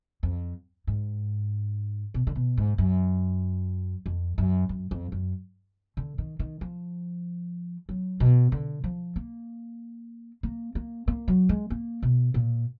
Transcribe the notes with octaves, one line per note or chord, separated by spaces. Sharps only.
F2
G#2
B2
D3
B2
G#2
F#2
F2
F#2
F#2
F2
F#2
D3
D#3
D#3
F3
F#3
B2
D3
F3
A#3
A#3
A#3
A#3
F#3
G#3
A#3
B2
A#2